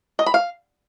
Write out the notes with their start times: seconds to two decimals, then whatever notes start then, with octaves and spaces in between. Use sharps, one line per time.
0.19 D#5
0.26 B5
0.34 F5